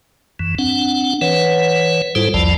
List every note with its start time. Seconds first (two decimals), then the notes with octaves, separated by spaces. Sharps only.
0.39 F#2 E3
0.59 C4 D4 F#5
1.21 E3 B4 C#5 F#5
2.15 G#2 G3 E4 F4 A4 C5
2.34 B1 E2 F3 D5 A5